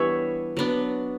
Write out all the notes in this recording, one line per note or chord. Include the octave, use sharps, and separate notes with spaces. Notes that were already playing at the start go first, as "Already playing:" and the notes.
Already playing: E3 G3 B3 D4 G4 B4 C#5 E5
F#3 B3 D4